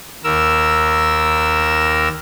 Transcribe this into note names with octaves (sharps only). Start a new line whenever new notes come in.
D#2 A#4 E6